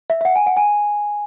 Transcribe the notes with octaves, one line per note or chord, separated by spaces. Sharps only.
E5
E5
F#5
G#5
F#5
G#5